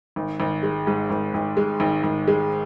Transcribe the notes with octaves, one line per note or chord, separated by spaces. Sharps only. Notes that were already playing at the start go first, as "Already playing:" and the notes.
G#1
G#1
G#3
G#2
G#1
G#1
G#3
G#1
G#1
G#3